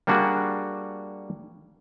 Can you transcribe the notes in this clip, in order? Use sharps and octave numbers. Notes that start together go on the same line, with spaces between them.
G3 A#3 D4 F#4 G#4